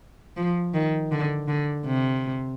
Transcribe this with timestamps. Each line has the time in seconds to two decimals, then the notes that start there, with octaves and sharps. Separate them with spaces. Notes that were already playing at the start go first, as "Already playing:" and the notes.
0.37 F3
0.74 D#3
1.12 D3
1.48 D3
1.86 C3